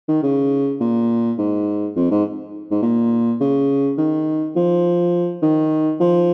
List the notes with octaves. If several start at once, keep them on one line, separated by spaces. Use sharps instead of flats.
D#3
C#3
A#2
G#2
F2
G#2
G#2
A#2
C#3
D#3
F3
D#3
F3